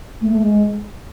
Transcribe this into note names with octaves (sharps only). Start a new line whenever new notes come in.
A3
A3
G#3